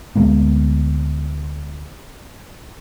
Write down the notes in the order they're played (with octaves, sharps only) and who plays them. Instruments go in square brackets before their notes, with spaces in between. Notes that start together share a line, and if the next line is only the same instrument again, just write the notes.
[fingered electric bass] D2 G#3 A#3 B3